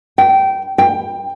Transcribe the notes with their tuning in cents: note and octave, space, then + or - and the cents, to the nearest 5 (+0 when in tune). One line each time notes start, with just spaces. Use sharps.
G5 -20
G5 +15